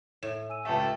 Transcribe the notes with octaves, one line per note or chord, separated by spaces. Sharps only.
A2 E7
G#5 E6 D#7
C#2 A3 G4 A4 E5 G5 A5